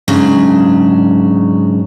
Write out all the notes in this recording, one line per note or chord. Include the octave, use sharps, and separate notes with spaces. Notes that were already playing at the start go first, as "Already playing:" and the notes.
G#2 C#3 F#3 D4